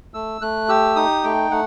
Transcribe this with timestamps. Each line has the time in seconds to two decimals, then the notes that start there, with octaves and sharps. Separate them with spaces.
0.14 A3 E6
0.41 A3 F#6
0.69 G4 E6
0.96 D#4 D#6
1.24 A3 G5
1.51 A3 F#5